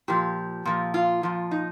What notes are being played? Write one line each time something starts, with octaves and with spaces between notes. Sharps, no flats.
A#2 F3 G4
A#2 F3
F4
A#2 F3
D#4